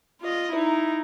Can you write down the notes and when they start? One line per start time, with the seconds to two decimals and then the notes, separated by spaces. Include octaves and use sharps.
0.21 F4 D#5
0.52 D#4 E4